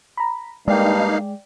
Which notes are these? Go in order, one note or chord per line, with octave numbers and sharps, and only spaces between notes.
A#5 B5
G2 G#3 A#3 D#4 D5 F5 G5